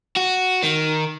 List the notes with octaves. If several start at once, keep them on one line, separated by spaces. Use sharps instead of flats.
F#4
D#3